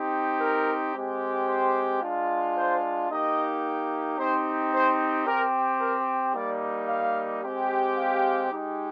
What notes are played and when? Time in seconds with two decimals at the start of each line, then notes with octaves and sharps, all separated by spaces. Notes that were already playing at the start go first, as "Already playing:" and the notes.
Already playing: C4 D#4 G4
0.40 A#4
0.95 G#3 C4 G4
1.48 C5
2.02 G#3 D4 F4
2.57 C5
3.11 A#3 D#4 G4 D#5
4.18 C4 D#4 G4 C5
4.72 C5
5.26 C4 G4 A#4
5.81 A#4
6.34 G3 A#3 D#4 D5
6.89 F5
7.43 G#3 C4 G4
7.96 F5
8.50 G#3 D#4 G4